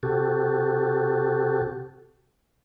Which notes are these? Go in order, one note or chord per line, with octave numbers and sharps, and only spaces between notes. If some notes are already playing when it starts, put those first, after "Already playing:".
C3 F#4 G4 A4